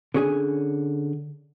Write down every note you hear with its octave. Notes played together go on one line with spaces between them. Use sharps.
D3 C#4 G#4 G#5